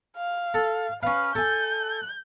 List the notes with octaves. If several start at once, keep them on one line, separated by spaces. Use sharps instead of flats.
F5
A4
C#4 B4 F5
A4 G#5 G6